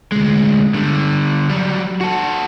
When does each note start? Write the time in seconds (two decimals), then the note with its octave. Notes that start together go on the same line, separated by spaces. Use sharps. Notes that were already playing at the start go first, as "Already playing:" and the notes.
0.12 D2 G#3
0.74 D3 G3
1.49 F#3 G3
2.01 F#4 A4